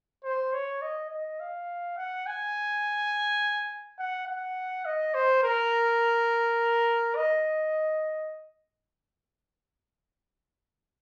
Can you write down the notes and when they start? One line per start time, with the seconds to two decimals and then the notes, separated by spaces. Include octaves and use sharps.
0.24 C5
0.53 C#5
0.81 D#5
1.10 D#5
1.40 F5
1.97 F#5
2.26 G#5
3.99 F#5
4.28 F#5
4.85 D#5
5.14 C5
5.43 A#4
7.16 D#5